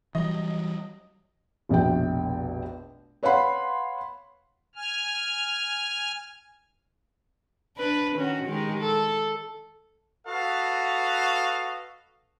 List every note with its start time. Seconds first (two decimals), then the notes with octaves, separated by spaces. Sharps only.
0.15 E3 F#3 G3 D#5
1.69 F1 A#1 B2 G5
3.23 B4 C#5 F5 F#5 B5 C6
4.75 G#5 F6
7.76 D4 B4
8.16 D#3 C#4 F#4
8.46 D#3 G#3 G4
8.80 A4
10.27 F#4 A4 B4 D#5 F5